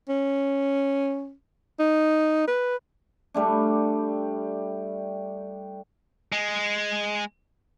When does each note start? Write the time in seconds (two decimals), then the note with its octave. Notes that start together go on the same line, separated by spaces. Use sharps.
0.09 C#4
1.79 D#4
2.48 B4
3.34 G3 A3 D4
6.32 G#3